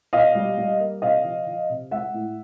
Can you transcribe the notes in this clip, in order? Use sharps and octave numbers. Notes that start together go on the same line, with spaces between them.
B2 D#5 F5
G3
G3
A#3
C3 D#5 F5
F3
F3
C3
G#3 E5 F#5
A2